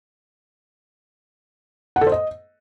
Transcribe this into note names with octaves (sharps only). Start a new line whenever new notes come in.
F#5
A4
C5
D#5